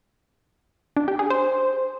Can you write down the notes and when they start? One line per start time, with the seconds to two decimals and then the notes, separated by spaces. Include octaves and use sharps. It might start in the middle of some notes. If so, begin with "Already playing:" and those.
0.97 D4
1.08 G4
1.19 G#4
1.30 C5